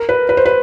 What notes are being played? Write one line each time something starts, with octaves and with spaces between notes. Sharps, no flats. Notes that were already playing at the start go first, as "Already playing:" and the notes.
Already playing: A#4
B4
B4
C5
B4